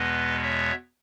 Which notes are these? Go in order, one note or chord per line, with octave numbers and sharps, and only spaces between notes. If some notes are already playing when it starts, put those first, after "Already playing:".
Already playing: E2 B2 G#3 B3 B4 D#5
C#5 E5